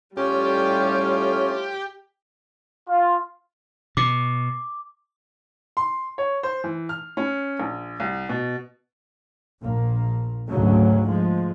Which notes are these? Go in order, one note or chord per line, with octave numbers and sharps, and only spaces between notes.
A2 G3 C#4 F4 G4
F4
B2 D6
C6
C#5
C5
E3
F6
C#4
A#1
C2
B2
A#1 A#3
D2 G#2 C#3 F#3
F3 G#3